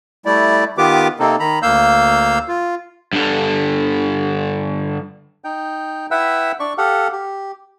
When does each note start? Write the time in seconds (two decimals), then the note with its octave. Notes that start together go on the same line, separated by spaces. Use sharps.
0.26 G3 A3 E4 D5
0.78 D#3 B3 F4 G4 B4 D6
1.20 C3 A#3 C4 D#4 A4
1.40 D#3 A#5 B5
1.62 D2 A#3 F5 E6 G6
2.48 F4
3.13 G2 D3
5.44 D#4 G5
6.11 E4 B4 E5 F#5 G5 E6
6.60 D4 D5 C#6
6.78 G4 A4 F5 F#5
7.12 G4